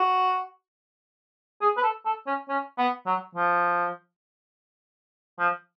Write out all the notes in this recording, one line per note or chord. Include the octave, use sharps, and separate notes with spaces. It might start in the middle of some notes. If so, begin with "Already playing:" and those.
Already playing: F#4
G#4
B4
A4
A4
C#4
C#4
B3
F#3
F3
F3